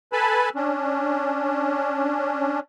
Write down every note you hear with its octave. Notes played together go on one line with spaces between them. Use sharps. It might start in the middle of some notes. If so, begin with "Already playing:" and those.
A4 B4 G#5 A5 B5
C#4 D4